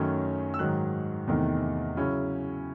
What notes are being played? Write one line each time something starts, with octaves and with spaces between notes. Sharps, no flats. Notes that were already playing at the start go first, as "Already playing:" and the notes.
Already playing: F#2 D#3 F#3 A3 C#4
E6
G#2 D#3 F#3 F#6
E2 C3 D#3 A3 D#4
C#3 F#3 C#4 E4